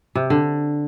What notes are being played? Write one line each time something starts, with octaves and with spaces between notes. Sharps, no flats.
C3
D3